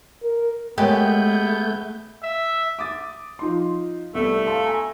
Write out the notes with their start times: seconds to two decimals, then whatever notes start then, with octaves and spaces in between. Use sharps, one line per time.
0.22 A#4
0.78 G#3 A3 B3 G4 A#4 C#5 G6
2.23 E5
2.79 D6 D#6 A6
3.39 F3 D#4 C6
4.15 C2 A3 B3 A4
4.46 F5 A5 C6
4.66 G#5 A#5